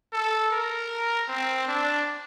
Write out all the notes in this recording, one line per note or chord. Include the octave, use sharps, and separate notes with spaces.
A4
A#4
C4
D4